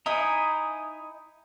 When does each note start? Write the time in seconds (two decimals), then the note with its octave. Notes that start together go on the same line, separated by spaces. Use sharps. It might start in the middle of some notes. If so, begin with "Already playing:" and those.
0.06 D#4 E4 G#5 A#5 D#6